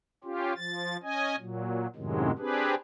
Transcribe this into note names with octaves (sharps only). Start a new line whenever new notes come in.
C#4 F4 G4
F3 A6
C#4 D#5 G#5
A#2 F#3
F#2 A2 C3 D#3 F#3 G#3
C4 D4 G4 G#4 B4